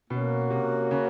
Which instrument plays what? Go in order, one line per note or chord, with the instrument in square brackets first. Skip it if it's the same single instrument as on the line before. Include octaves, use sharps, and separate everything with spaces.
[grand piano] B2 [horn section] A#3 C#4 F#4
[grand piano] C3
C#3